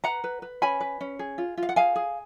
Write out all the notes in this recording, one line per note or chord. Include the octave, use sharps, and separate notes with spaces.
B4 F#5 A#5
B4
B4
C#4 G#5 B5
B4
C#4
G#4
F4
F4
F5
F#5
G#4 F5 G#5
G#4